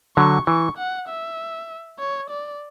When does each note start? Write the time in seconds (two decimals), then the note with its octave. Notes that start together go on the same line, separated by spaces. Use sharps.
0.17 D3 F#3 C#6
0.47 E3 C#6
0.78 F#5
1.08 E5
1.99 C#5
2.30 D5